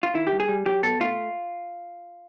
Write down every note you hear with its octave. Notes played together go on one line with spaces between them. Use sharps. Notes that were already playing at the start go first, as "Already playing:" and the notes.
F4
D#3 E4
G4
G2
G#4
G3
F#3 G4
B2 A4
A3 F4